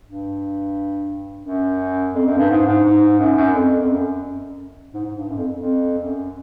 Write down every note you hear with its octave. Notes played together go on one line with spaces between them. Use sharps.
G2
F#2
F2
F#2
G2
G#2
G#2
G#2
F#2
F#2
F2
F2
F#2
G#2
G#2
G2
F#2
F2
F2
F#2